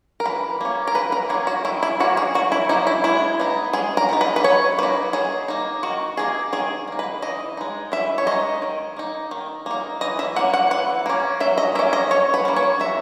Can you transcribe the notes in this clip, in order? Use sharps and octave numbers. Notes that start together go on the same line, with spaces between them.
A#4
E3 B4
A#3 C#4
A#4
E3 B4
A#4
A#3 C#4 G#4
F#4
D#3 E4
E4
F#3 A#3 C#4 F#4
G#4
D#3 F#4
E4
F#3 A#3 C#4 D#4
E4
G#3 E4
B3 D#4
G#3 G#4
A#4
B3 D#4
B4
B4
F#3 C#5
A#3 D#4 B4
F#3 G#4
A#3 D#4
D#3 F#4
A#3 D#4 G#4
D#3 G#4
A#3 D#4
B4
E3 D#5
G#3 D#4
E3 E5
C#5
G#3 D#4 D#5
D#3
A#3 D#4
D#3
A#3 D#4
E3 D#5
E5
A#3 C#4 F#5
F#5
E3 F#5
A#3 C#4
F#3 E5
D#5
A#3 C#4 E5
D#5
F#3 C#5
B4
A#3 C#4
C#5
F#3 E5